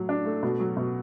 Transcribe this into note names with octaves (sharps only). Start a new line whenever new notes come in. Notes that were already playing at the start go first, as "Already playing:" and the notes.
Already playing: A2 F#3
D4
A3
B2
F#3
B2